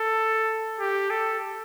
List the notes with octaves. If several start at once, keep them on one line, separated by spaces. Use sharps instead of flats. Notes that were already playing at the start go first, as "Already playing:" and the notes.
Already playing: A4
G4
A4